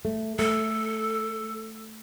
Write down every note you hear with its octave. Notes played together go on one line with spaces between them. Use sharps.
A3
A3 A4